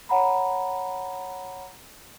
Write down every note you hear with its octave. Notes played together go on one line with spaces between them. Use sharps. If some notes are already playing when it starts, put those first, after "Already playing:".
C#5 F#5 A#5 B5